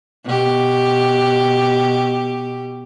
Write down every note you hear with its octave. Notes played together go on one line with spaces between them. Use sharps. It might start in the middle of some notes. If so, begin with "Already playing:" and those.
B2 G4